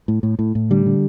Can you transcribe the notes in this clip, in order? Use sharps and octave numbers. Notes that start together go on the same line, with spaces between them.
A2
A2
A2
A2
D3 G3
D3